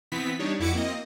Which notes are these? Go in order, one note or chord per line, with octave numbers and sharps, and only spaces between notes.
E3 B3 C4 B6
G3 D4 D#4 C#5
F2 E4 F#4 D6 C#7
A#3 C4 D#5